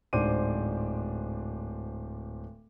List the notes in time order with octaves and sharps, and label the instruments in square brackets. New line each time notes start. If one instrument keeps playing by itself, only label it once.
[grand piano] D1 G#2 D4 C5 D6 D#7